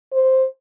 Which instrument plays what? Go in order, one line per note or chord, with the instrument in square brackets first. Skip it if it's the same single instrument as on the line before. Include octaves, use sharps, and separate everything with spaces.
[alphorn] C5